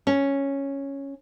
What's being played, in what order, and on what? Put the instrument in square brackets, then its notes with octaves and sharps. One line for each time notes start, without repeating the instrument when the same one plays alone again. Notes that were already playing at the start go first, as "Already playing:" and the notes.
[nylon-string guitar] C#4